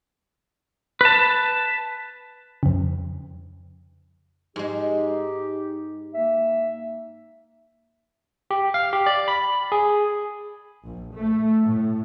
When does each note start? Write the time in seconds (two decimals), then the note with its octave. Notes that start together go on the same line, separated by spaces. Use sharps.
1.01 B4 A5
2.63 F2 C#3
4.56 G#2 G#3 D#4 G4
6.14 A#3 E5
8.51 G4
8.74 F5
8.93 G4
9.06 D5
9.28 B5
9.72 G#4
10.85 A#1
11.16 A3
11.62 A2